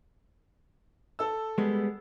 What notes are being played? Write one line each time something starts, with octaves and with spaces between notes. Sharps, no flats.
A4 E6
G3 G#3 B3